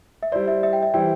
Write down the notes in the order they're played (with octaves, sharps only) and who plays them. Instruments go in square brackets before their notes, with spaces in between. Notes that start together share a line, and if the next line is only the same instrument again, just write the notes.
[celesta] E5
[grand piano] G3 E4 C5 [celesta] D5
[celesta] E5
E5
G5
E5
[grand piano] E3 G3 E4 C5 [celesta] G5